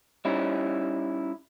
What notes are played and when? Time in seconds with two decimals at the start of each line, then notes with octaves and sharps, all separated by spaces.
0.25 G3 C#4 D#4 E4